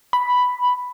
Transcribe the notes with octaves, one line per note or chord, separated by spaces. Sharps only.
B5